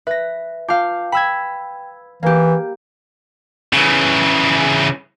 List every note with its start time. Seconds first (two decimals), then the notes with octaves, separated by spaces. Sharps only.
0.07 B4 E5 A#6
0.69 F4 F5 G5 A5 D6
1.12 G5 B5 E6 G#6
2.23 E3 A#3 G4 F5
3.73 C#3 E3